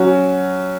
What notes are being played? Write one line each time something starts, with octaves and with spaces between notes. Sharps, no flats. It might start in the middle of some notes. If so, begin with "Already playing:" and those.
Already playing: F#3 C#4 F#4